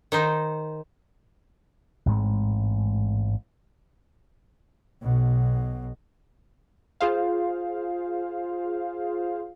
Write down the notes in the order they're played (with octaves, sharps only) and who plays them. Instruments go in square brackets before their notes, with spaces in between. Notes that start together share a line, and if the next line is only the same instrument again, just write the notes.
[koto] D#3 D#4 C5
[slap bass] A1 G#2 G#3 C4
[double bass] B1 B2
[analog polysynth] F4 G#4 C5 F5